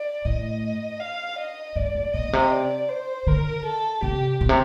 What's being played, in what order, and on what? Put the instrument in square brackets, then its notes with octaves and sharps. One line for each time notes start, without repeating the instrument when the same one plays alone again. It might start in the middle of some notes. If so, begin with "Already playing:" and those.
Already playing: [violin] D5
[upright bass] A2 [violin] D#5
[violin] F5
D#5
[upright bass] G2 [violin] D5
[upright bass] F2
[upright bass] A#2 [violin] D#5
[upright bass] A#2
C3
[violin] D5
C5
[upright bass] D3 [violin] A#4
[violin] A4
[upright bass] C3 [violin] G4
[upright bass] A#2
C3